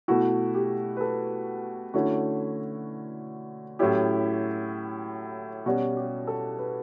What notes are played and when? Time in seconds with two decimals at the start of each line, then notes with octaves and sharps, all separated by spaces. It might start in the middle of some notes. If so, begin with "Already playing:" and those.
0.08 B2 A3 E4 F#4
0.55 G4
0.97 B4
1.01 A4
1.94 D3 A3 C#4 E4 F#4
3.79 A2 F#3 C#4 E4 G4
5.66 B2 G3 C#4 F#4
5.97 G4
6.27 A4
6.59 B4